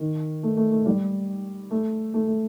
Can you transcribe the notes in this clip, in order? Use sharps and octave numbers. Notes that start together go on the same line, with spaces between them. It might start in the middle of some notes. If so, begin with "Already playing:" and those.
Already playing: D#3
A3
A3
A3
G3
A3
A3
A3